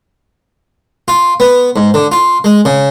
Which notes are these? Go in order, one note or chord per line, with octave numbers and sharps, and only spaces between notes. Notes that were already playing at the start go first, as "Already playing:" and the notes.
F4
B3
G#2
D3
F4
G#3
C#3